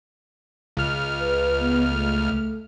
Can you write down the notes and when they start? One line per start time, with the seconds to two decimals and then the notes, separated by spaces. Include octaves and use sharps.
0.77 C#2 F6
1.21 B4
1.61 B3
1.90 A3